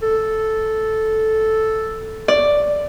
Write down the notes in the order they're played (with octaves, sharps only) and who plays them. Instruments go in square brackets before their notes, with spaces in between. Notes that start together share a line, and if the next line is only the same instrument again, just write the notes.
[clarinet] A4
[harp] D5